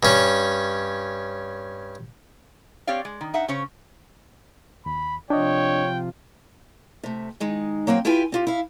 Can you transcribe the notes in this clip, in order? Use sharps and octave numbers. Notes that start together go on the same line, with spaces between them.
G2 C#4
C4 G4 C#5 D5 F5
G#3
D#3
D#4 E5 F#5
C#3 C#4 C5 C#5
D#2 B5
C3 F3 D4 F4 C#5 D#5 G5
C3 A3
D#3 G#3 D#4
F#3 A#3 C4 G5
E4 F4 G4 B4 G5 G#5
C4 F4 G4
E4 F5